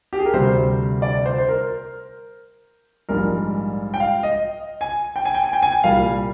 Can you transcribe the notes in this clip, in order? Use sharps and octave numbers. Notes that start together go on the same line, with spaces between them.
G4
G#4
A#4
D2 C3 G3 C5
D5
C5
C5
A#4
A#1 G#2 G3 A#4
G5
F5
D#5
G#5
G5
G#5
G5
G#5
G5
G#5
G5
C2 A#2 G3 F5